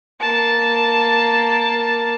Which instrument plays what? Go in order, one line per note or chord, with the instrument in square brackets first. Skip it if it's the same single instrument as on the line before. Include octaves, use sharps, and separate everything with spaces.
[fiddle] A#3 A5